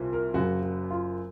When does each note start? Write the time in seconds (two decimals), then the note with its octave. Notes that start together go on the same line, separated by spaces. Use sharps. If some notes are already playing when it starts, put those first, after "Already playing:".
Already playing: C2 A#2
0.13 A#4
0.34 F#1 F#2 C#3 F#4
0.63 F#4
0.90 F4